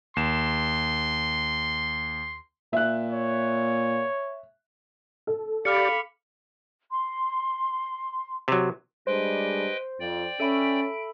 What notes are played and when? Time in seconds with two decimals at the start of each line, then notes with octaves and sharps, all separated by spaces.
0.16 D#2 C6 E7
2.73 A#2 E5 F#6
3.11 C#5
5.27 A4
5.65 G4 D5 F5 B5 D6 F6 C#7
6.91 C6
8.48 C3 F#3
9.07 G3 G#3 D4 B4 C5 D#5 G5
10.00 F2 D5 G5
10.40 C#4 A4 E5 B5 D7